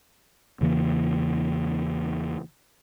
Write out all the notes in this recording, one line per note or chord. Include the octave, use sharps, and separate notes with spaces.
E2 C#3 E3 A#3